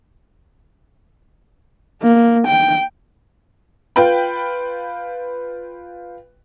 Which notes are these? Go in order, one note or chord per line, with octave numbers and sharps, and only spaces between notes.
A#3
G5
F4 B4 G5 B5